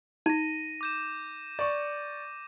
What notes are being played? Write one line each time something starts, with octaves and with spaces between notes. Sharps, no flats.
D#4 A#6 D#7
D6 G6 E7
D5 C#6